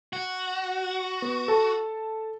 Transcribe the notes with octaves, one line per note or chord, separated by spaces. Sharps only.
F#4
B3
A4 A5